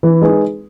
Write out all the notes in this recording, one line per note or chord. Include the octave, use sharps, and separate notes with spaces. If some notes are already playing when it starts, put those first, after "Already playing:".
E3
G#3 D#4 G#4 B4